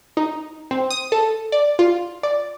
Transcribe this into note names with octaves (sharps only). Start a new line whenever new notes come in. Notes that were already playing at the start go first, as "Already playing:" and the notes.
D#4
C4
D#6
A4
D5
F4
D5